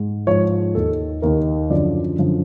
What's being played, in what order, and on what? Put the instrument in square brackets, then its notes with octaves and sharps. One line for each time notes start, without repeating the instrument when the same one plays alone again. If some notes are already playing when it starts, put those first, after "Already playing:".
Already playing: [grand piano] G#2
G#2 F3 C#5
D#2 D#3 A4
D#2 D#3 A#4
F#2 D3 F3 D5
F#2 D3 F3